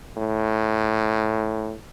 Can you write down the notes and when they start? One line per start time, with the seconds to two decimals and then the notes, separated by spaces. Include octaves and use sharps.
0.17 A2